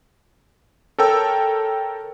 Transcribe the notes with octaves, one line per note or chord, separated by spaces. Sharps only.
A4 A#4 C#5 G5 A5 E6